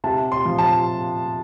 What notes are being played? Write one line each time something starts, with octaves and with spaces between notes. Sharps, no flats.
C3 A5
C6
F3
A5